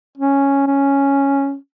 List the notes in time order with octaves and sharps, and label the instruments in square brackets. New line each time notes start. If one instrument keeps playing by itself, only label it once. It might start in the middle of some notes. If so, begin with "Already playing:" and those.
[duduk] C#4
C#4